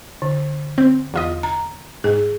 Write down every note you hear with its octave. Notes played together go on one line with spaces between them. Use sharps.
D3
C4
E2 F4 D#5
A#5
G#2 G#4